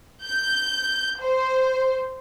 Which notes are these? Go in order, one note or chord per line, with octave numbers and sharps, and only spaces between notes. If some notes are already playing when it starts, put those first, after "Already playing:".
G6
C5